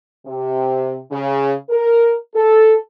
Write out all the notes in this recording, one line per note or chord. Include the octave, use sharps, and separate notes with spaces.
C3
C#3
A#4
A4